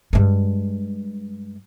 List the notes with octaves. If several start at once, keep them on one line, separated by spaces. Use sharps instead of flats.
G2 G#3